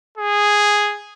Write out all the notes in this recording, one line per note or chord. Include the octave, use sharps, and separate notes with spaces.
G#4